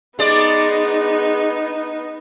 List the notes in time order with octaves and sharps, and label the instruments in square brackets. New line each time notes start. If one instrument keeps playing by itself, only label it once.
[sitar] G#3 D5 [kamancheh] B3 D#4